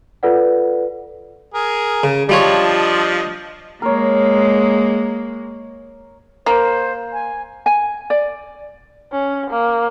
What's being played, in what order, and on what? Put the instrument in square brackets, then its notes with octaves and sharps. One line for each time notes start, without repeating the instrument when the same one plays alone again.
[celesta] F4 A4 B4 D5 F#5
[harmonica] G#4 A#4
[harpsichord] C#3
[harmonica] F3 D4 D#5 [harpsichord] G3 F4 C#5
[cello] G#3 A#3 [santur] A#4 C#5
[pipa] A#3 [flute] C5
[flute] G#5
[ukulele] G#5
D5
[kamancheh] C#4
A#3